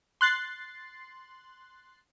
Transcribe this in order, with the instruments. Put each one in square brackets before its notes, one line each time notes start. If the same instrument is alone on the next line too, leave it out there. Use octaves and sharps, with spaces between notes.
[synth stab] C6 F#6 A6 C7